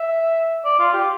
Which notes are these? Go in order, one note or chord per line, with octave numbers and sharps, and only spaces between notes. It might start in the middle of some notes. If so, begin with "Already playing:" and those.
Already playing: E5
D5
F4
G4